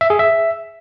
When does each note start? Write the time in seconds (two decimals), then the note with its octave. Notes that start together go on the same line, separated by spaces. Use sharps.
0.01 E5
0.10 G#4
0.19 E5